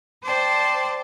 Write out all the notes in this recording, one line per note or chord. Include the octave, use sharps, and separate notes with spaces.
C5 D5 G5 A5